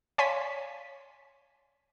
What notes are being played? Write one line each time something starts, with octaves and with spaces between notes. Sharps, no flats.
C#5 D5 F5 G#5 C6 B6